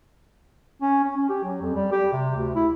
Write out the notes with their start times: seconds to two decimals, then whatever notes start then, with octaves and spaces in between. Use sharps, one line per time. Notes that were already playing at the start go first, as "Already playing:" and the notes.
0.82 C#4
1.04 C#4
1.17 C#4
1.29 G4
1.44 F#3
1.62 F2
1.75 G3
1.92 G4
2.13 C3
2.35 D2
2.55 E4